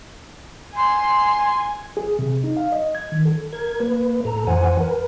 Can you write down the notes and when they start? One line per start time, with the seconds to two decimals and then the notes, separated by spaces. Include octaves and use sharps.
0.76 G#5 C6
1.97 G#4
2.19 C3
2.44 D#4
2.57 F5
2.72 D#5
2.95 G#6
3.12 D#3
3.25 A4
3.53 A#4 G#6
3.80 A#3 B4
4.25 A2 A4 A#5
4.47 F2 E3 C5 F#5 G#5
4.80 A#4 B4